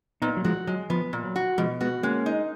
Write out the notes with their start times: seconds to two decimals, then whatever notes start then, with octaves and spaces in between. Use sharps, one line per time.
0.22 A#2 B3 D#4
0.37 F#3
0.45 F3 G#3 F#4
0.67 F#3 G#3
0.90 F3 B3
1.13 A#2
1.24 F#3
1.36 F#4
1.58 B2 F3 G#3
1.81 G#3 B3 F#4
2.03 G#3 A#3 C#4
2.26 D#4